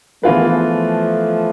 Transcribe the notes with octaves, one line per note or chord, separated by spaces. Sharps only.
E3 F3 A3 B3 F4 G#4 B4